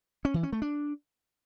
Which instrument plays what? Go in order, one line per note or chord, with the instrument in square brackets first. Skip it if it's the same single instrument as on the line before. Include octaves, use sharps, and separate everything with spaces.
[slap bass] C#4
E3
C#4
A3
D4